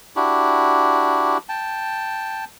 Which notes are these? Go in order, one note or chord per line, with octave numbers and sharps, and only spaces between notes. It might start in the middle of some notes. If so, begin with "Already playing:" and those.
D4 E4 F#4 G4
G5 A5